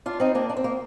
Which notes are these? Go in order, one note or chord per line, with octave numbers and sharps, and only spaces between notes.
D4 F4
C4 D#4
A#3 D4
D4
C4
A#3